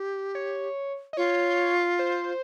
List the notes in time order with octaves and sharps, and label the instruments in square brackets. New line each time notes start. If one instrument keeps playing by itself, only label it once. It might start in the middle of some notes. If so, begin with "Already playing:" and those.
Already playing: [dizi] G4
[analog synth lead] C#5
D#5
[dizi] F4 [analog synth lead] C#5
[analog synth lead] C5